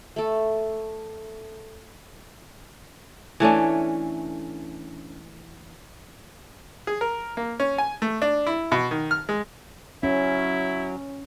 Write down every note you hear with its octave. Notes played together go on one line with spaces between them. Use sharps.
A3 A4
E3 A3 C#4 D4
G#4
A#4
A#3
C#4
G#5
A3
D4
E4
B2
D#3
F6
G#3
F#3 C#4 E4